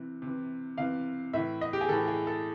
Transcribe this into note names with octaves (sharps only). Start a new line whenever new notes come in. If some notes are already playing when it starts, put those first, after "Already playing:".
Already playing: C3 E3
C3
E3
C3 E3 F5
A2 E3 E5
D#5
G4
G#4
A2 E3 A4
G#4
A4